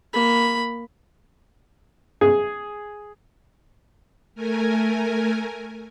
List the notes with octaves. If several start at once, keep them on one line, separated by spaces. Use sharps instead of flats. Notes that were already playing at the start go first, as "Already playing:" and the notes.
A#3 B5
G#4
A3 A#4 G#5